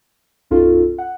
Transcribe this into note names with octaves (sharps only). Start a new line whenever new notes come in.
B1 F#2 C#4 D#4 F4 A4
F#5